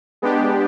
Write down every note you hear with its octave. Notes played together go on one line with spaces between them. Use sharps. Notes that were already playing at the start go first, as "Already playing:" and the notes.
G#3 B3 D4 G4